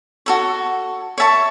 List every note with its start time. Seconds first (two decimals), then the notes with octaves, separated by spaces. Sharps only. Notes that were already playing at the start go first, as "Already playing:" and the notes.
0.26 F#4 A4 C#5
1.18 C#5 E5 A5 C#6